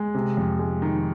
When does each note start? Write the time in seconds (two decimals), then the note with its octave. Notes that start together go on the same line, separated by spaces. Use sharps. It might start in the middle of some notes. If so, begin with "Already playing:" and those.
Already playing: G#3
0.15 C3
0.37 F2
0.59 G#3
0.82 D#3